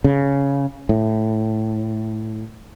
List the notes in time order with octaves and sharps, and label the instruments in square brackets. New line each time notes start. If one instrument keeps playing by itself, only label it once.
[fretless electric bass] C#3
A2